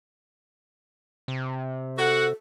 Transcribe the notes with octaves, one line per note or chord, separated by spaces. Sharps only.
C3
F#4 A4 F#5